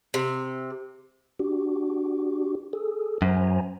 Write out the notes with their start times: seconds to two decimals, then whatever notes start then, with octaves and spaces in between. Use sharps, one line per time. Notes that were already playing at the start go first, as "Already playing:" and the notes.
0.14 C3
1.39 D4 F#4 G4
2.73 G#4 A4
3.22 F#2 C5 G#5 A#5